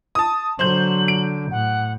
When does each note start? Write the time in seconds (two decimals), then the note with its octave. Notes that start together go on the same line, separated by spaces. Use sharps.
0.15 A5 D#6
0.59 D3 F#3 C5 G6 F#7
1.08 D7
1.51 A2 F#5